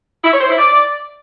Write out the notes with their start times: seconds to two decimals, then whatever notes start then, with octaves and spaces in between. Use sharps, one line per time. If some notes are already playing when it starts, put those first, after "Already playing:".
0.23 E4
0.32 C#5
0.41 C5
0.50 E4
0.58 D5